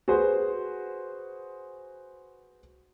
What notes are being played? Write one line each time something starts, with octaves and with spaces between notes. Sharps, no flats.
F#4 G#4 B4 C5